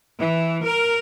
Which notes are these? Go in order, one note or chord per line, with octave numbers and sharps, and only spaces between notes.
E3
A#4